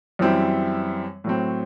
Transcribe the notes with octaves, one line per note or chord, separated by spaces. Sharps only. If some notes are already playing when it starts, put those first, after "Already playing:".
F#2 E3 G3 C4 E4
A2 F#3 C4